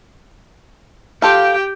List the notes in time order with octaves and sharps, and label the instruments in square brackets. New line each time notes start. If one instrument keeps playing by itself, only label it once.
[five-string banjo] F4 A4 F5 [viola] G4 G5